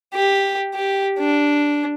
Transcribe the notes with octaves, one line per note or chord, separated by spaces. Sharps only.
G4
G4
D4